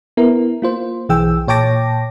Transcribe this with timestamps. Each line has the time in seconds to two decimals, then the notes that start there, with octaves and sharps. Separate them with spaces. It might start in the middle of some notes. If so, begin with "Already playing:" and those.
0.17 B3 E4 A#4
0.62 A#3 F4 C5
1.09 B1 E3 G#4 G5 E6
1.48 A#2 C#5 G5 A5 D6 A#6